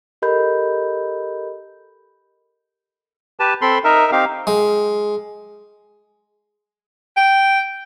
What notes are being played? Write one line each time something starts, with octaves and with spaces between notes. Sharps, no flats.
G4 A4 A#4 D#5 B5 G6
G4 B4 A5
C4 A4 B5 C6
D#4 A#4 E5
C4 D#4 G4 F5
G#3
G5